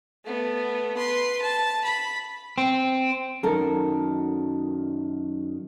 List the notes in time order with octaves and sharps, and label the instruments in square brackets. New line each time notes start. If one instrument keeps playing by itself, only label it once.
[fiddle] A3 B3
B4 C6
A5
B5
[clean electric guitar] C4
[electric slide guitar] F#2 D#3 [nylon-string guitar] A4 A#4